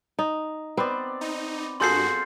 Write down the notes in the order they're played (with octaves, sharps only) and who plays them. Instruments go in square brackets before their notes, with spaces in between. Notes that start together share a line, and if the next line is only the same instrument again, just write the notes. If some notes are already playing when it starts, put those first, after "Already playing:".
[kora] D#4
[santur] B3 D5 [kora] C4 B4 C5
[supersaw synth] D#4
[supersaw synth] G2 F#4 [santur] F4 G#4 A4 [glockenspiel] C6 G6 C7